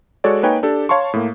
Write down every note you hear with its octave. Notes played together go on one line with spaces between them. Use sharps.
G#3 F#4 A4 C#5 D5
A#3 D#4 B4 C#5 G5 G#5
D4 G4 A4
C#5 F5 A5 C6 C#6
A2 A#3